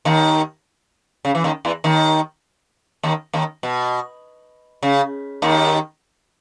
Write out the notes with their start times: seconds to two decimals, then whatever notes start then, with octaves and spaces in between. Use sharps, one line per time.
0.05 D#2 D#3
1.25 C#3
1.35 E3
1.44 D#2 D#3
1.65 E2 E3
1.84 D#2 D#3
3.03 D#2 D#3
3.33 D#2 D#3
3.63 B2
4.83 C#3
5.42 D#2 D#3